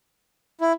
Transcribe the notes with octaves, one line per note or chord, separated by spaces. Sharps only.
E4